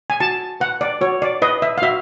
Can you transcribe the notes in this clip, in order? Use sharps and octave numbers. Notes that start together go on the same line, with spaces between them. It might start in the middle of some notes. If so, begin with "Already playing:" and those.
G#5
F#4 A5
B4 F#5
D5
F#4 C#5
D5
B4 D#5
E5
F5
F#4 E5